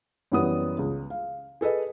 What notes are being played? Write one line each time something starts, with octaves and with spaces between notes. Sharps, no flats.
F#2 E3 G3 B3 F#5 D#6
C#2
F5
G#4 A4 B4 D#5